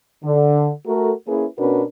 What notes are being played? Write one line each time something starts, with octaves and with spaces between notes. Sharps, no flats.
D3
A3 F#4 A4 A#4
A#3 C#4 E4 G#4 B4
B2 C#4 D4 F#4 A#4 B4